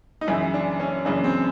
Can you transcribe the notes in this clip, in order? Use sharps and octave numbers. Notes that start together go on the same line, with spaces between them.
D#4
F#2 C#3 E3 E4
D4
C#4
F#2 C#3 E3 D4
C4